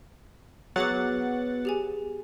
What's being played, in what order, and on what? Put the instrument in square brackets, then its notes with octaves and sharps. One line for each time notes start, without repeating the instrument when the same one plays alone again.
[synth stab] F#3 F#5 A6 [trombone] B3 [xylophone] G#4 D6
[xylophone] G4 G#4 G#5